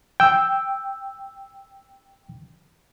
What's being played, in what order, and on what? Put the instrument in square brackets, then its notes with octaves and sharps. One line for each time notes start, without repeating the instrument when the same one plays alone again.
[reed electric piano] G5 E6